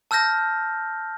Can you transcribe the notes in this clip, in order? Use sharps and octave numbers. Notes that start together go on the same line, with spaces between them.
A5 E6 F6 G6 A#6